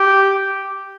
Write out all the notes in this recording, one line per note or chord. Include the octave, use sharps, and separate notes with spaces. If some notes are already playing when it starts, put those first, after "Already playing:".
Already playing: G4